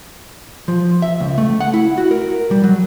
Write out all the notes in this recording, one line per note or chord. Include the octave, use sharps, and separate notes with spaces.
F3
E5
C#2
A3
F#5
E4
F#4
A#4
G3
F#3